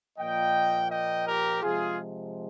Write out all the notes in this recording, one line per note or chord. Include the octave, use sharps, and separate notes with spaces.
A#2 F3 A#3 D#5 G5
D#5 G5
G4 A#4
C3 F3 G#3 F4 G#4